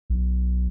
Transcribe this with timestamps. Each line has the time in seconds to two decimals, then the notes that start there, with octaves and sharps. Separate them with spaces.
0.10 B1